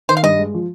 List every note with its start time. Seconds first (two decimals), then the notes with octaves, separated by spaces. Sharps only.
0.09 D#3 C5
0.17 F5
0.23 G2 D#5
0.38 G#3
0.54 F3